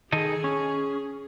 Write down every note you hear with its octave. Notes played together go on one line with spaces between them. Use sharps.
D#3 G#4 A4 D#5
C#4